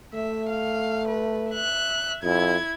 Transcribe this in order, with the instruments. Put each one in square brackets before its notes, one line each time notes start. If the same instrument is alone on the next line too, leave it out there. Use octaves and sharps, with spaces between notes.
[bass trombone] A3 [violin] E5
[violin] F5
B4
E5 F#6
[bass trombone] F2 [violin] E4 G#6